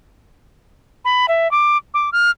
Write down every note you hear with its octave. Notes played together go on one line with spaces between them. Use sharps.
B5
E5
D6
D6
F6